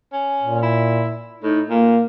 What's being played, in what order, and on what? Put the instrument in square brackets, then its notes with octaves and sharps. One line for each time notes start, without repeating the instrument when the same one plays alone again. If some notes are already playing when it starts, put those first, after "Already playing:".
[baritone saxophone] C#4
[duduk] A#2
[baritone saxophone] E4
[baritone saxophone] A2 [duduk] D#4
[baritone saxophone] A#2 [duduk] A#3